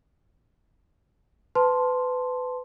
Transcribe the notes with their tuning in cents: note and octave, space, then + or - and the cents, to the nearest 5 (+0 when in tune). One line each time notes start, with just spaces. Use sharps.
B4 +30 A5 +0 C6 +0